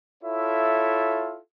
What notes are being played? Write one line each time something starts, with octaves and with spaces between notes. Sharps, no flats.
E4 F4 A4 C#5 E5